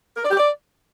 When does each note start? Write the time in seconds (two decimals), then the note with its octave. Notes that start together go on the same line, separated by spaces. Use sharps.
0.17 A#4
0.24 D5
0.30 G4
0.37 D5